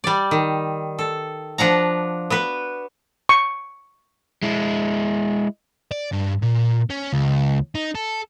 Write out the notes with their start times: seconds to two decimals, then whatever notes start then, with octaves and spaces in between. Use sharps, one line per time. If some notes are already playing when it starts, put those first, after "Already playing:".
0.04 G3 D5
0.31 D#3
0.99 A4
1.58 F3 D4 F#5 A#5
2.30 B3 F#4 B4
3.29 C#6
4.43 G#3 E4
5.91 D5
6.12 G2
6.42 A#2
6.90 C#4
7.13 C#2
7.75 D#4
7.95 A4